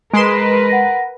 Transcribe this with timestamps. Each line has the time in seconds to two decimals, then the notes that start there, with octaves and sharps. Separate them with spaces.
0.13 G#3 A#4 B4 C6 D7 E7
0.69 F#5 A#6